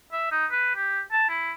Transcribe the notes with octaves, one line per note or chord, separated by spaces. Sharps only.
E5
D#4
B4
G4
A5
E4